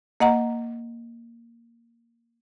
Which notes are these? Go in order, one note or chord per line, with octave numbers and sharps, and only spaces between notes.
A#3 D#5 F#5 A#5